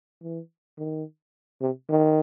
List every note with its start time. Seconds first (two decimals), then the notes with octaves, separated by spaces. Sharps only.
0.22 E3
0.78 D#3
1.61 C3
1.90 D#3